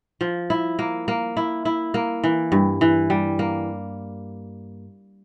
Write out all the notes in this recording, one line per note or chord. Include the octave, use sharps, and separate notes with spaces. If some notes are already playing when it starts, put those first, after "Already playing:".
F3
E4
A#3
A#3
E4
E4
A#3
E3
G2
E3
G3
A#3